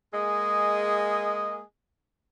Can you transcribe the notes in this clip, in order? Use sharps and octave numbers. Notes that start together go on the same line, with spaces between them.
G#3 A#3 G#4 D#5